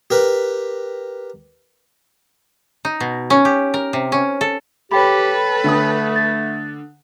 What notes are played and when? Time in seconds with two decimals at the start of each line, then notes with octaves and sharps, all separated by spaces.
0.10 G4 A#4 B4
2.85 D#4
3.00 B2
3.30 C#4
3.45 G4
3.74 A#4
3.93 C3
4.12 C#4
4.41 A4
4.92 G4 A4 B4 C#5 G5 B5
5.64 D3 A3 D#6
6.16 A6